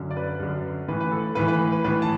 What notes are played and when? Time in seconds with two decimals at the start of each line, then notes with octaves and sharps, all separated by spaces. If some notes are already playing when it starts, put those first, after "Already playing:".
Already playing: F#2 D3
0.11 D5
0.17 B4
0.40 F#2 D3
0.88 A2 E3 B4
1.00 B4
1.12 A4
1.35 A2 E3 B4
1.48 B4
1.72 B4
1.84 A2 E3 B4
2.02 A5